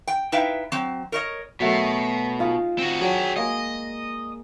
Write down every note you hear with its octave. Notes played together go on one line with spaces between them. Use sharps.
G5
D#4 E4 B4 E5 F5 G5
F#3 C4
A#4 C#5 D#5
B2 F#3 A3 A#4
D#4 F4 G#4
C4 F#4
F#3 D4 G#4 G5
G#3 A#3 G#4 D#5